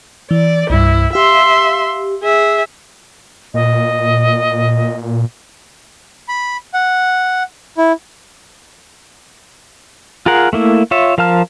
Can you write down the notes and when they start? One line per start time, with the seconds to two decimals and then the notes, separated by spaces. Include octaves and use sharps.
0.31 E3 D5
0.70 C2 G2 E4
1.13 G4 E5 F5 C6
2.23 G#4 E5
3.54 A#2 D#5
6.28 B5
6.74 F#5
7.78 E4
10.26 F4 G#4 A#4 F#5
10.53 A3 A#3 E4
10.91 F4 C#5 E5
11.18 F3 A#4 F5 A5 F6